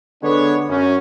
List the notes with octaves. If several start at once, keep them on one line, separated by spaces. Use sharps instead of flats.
D3 G#3 B3 D4 B4 C#5
F#2 C#4